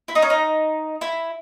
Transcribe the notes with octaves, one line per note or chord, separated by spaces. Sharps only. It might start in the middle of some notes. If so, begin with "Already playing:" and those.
E4
D#4
C#4
D#4
E4